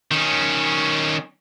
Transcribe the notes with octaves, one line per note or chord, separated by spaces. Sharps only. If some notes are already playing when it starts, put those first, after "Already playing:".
D#3 C#4